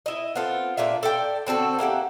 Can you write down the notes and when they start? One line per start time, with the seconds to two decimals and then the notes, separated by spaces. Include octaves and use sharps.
0.06 E4 D#5
0.35 B3 C4 F4 A4
0.77 A#2 D4 F4 E5
1.03 A4 D5 G5
1.47 D3 C4 F#4 A4
1.79 A#3 E4 G4 F#5